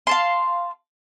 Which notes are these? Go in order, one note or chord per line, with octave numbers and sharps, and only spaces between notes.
F5 A5 C6